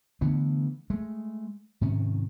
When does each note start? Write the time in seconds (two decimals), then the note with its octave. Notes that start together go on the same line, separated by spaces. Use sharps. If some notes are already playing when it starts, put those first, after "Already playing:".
0.21 D3 E3 A3 B3
0.90 G#3 A3
1.81 G#2 C3 D#3 C#4